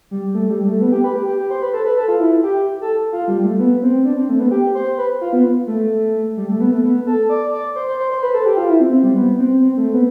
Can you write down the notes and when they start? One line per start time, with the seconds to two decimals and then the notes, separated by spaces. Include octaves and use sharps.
0.11 G3
0.34 A3
0.50 G3
0.65 A3
0.81 B3
0.92 G4
1.04 B4
1.16 G4
1.27 G4
1.39 G4
1.50 C5
1.62 B4
1.73 A4
1.85 B4
1.97 A4
2.08 F4
2.19 E4
2.43 G4
2.82 A4
3.13 F4
3.28 G3
3.44 A3
3.59 B3
3.82 C4
4.05 D4
4.17 C4
4.29 A3
4.40 B3
4.51 G4
4.75 C5
4.98 B4
5.21 F4
5.33 B3
5.67 A3
6.37 G3
6.49 A3
6.60 B3
6.71 A3
6.84 B3
7.07 A4
7.29 D5
7.53 D5
7.76 C5
7.88 C5
7.99 C5
8.11 C5
8.22 B4
8.34 A4
8.46 G4
8.57 F4
8.69 E4
8.80 C4
8.92 C4
9.03 G3
9.15 B3
9.39 C4
9.62 C4
9.77 A3
9.93 B3